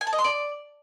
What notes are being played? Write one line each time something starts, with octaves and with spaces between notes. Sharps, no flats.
G#5
A5
D#5
C6
D5